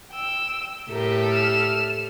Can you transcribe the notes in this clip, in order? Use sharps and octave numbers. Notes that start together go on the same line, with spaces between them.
G5 E6
A2 G4 A4 A#4 G5
F6 E7